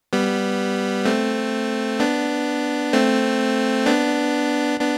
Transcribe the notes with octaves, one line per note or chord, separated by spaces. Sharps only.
G3 B3
A3 C4
B3 D4
A3 C4
B3 D4
B3 D4